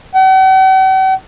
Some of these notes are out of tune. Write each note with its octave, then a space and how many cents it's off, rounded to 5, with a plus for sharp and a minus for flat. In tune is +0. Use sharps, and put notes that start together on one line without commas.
F#5 +45